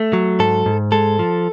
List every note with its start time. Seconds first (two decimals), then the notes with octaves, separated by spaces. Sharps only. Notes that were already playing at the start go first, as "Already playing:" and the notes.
Already playing: A3
0.13 F#3
0.39 G#2 A4
0.66 G#2
0.92 G#3 A4
1.19 F3